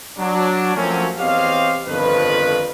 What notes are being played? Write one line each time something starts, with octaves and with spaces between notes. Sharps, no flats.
F#3 D4
F3 F#3 A3 A#3 C4 C#4
E2 C4 G4 C#5 D#5 F5
G1 F2 D#3 F3 B4